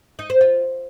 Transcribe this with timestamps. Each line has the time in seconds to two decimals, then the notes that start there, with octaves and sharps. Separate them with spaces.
0.19 D#4
0.30 C5
0.41 F4